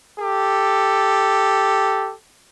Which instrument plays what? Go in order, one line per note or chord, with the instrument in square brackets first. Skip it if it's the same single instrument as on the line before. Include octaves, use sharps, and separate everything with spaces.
[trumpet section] G4 A4